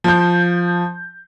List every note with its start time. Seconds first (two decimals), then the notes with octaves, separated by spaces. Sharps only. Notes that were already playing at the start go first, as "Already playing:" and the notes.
0.04 F3 G6